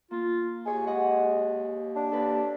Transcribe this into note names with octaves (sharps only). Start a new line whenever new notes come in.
A#3 F4
D#2 G#4 C#5 G#5
G#3 D#4 D#5 F#5
D4
D#2 A4 B4